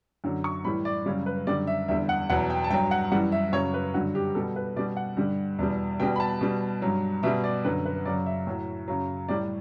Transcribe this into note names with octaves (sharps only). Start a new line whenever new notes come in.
F#2 D3 F#3
C#6
A2 E3 G3 B5
D5
F#2 C#3 G3 C#5
B4
F#2 D3 G3 D5
E5
E2 D3 G3 E5
F#5
E2 B2 F#3 F#5
G5
A5
G2 F#3 G5
F#5
F#2 E3 G3 F#5
E5
F#2 C#3 F#3 C#5
B4
G2 D3 F#3 F#4
G4
B2 G3 A4
B4
B2 G3 D5
F#5
G2 D3 G3
E2 B2 G3
B2 G3 G5
B5
A5
B2 G3
G2 F#3
B2 G3 E5
D5
F#2 D3 F#3 B4
B4
F#2 C#3 F#3 D5
E5
A2 F#3
F#2 C#3 F#3
A2 G3 D5